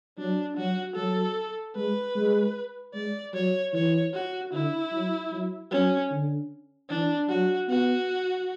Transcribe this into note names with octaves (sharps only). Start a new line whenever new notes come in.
F#3 D4
F#3 F#4
F#3 A4
G#3 B4
G#3
G#3 D5
F#3 C#5
E3 C#5
F#4
D3 E4
F#3
F#3
F#3 C#4
D3
E3 D4
F#3 F#4
B3 F#4